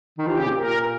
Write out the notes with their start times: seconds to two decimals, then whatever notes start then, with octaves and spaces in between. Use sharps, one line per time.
0.18 D#3
0.27 F3 G4
0.38 C#3
0.47 A#2
0.57 A#4